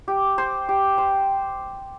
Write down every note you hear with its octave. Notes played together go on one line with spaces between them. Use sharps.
G4
C5
G4
C5